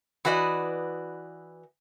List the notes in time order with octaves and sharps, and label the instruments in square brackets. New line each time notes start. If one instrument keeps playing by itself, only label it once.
[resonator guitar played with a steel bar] E3 F#4 B4 D5 D#5